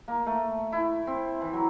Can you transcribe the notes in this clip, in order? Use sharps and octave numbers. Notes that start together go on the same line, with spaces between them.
A#3
A3
E4
C4
E3
F#3